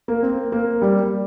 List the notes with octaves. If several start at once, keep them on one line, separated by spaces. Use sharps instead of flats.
A#3
C4
A#3
G3